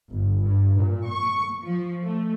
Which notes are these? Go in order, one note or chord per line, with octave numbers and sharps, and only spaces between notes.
G1
G2
A#2
C#6
F3
A3